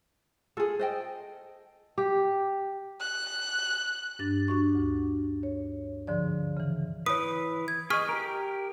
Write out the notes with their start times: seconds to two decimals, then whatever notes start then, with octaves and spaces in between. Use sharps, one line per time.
0.57 F4 G#4 A4
0.79 C5 D#5 G5
1.98 G4
3.00 F#6
4.19 G2 D4 A6
4.48 D4 F#4 C#6
4.75 D2
5.43 C#5
6.07 G#2 D3 F3 D5
6.57 C#3 E3
7.06 E3 B4 C#5 D#6
7.68 G#6
7.90 G#4 D#5 C#6 F6 B6
8.09 G4 A#4